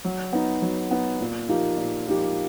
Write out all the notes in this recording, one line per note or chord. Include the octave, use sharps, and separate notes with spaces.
F#3
B3 D#4
F#3
B3 D#4
A#2
F3 A#3 D#4 G4
A#2
F3 A#3 D#4 G4